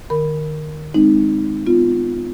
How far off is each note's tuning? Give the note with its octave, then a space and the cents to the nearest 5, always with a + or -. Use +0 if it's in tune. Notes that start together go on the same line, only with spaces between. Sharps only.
D#3 -40 A#4 +0 B5 +0
G#3 -10 C4 -10 D#4 -5
B3 +20 F4 +0